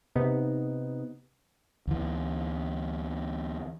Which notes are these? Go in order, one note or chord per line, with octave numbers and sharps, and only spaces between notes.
C3 B3 D#4
D2 E3